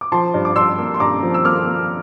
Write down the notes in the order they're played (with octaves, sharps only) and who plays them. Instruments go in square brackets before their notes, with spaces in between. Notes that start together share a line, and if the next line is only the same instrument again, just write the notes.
[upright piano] D6
F3 A5 C6
G2
D6
G2 C6 E6
A#3
C6
G2 A#5 D6
F3
E6
A#3 D6 F6
A#3